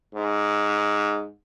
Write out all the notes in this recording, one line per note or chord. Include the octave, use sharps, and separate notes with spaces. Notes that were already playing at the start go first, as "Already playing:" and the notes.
G#2